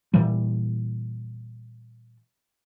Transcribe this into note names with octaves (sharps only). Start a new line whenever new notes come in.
A#2 E3 G3